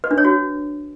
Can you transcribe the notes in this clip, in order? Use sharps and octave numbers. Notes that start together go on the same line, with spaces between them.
B4
D4
C#5
F#4